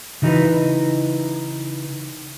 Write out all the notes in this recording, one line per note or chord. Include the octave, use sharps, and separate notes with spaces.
C#3 E3 D#4 F#4 B4